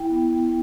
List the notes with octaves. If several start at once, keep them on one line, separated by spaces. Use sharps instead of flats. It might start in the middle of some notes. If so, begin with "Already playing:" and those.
Already playing: E4 G5
B3
B3
B3